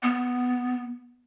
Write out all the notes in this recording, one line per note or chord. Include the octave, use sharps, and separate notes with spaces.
B3